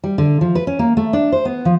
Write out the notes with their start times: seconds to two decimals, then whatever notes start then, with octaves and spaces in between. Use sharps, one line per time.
0.04 G3
0.18 D3
0.41 F3
0.55 B4
0.67 C#4
0.79 A#3
0.97 A3
1.13 D4
1.32 C5
1.45 B3
1.65 F3